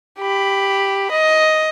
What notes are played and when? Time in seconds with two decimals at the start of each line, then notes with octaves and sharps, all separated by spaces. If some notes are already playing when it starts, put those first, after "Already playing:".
0.19 G4 B5
1.11 D#5